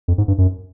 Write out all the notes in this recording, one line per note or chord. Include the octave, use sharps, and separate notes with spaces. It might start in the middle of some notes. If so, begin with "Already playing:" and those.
F2
G#2
G2
F#2